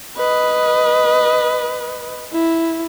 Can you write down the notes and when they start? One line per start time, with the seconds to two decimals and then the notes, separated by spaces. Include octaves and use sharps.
0.17 B4 D#5
2.33 E4